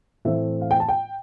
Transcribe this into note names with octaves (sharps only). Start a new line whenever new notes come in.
A2 E3 A3 C4 E5
F5
G5
A5
G5